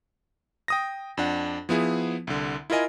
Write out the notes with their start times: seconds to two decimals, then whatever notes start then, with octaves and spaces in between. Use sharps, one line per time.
0.68 G5 D#6 A#6
1.17 F2 D4 F#5
1.69 F3 B3 E4 G#4
2.27 C2 D3
2.70 E4 F4 A#4 D#5 G#5